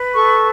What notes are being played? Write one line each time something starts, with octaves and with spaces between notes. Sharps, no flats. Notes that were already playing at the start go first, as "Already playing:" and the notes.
Already playing: B4
A4 C#6